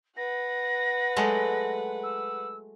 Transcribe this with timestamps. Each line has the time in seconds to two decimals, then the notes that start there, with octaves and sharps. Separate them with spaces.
0.17 B4 F#5 A#6
1.16 F#3 G#3 A3
2.03 E6